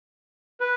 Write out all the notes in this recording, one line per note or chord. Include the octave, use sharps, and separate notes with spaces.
B4